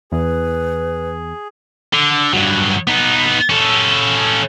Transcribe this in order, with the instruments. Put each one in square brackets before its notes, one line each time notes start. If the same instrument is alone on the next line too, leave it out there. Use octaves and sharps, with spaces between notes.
[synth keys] E2 [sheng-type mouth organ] G#4 [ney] B4
[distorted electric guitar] D3
G2 F#3
B3 D#4
C#4 A4